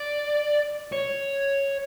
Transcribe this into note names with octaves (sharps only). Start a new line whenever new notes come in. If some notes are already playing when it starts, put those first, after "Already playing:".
Already playing: D5
C#5